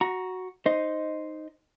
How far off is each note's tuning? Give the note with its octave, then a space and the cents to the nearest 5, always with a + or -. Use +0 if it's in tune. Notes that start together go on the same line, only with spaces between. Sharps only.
F#4 +0 A#5 +15
D#4 +0 C5 +0 D#5 +0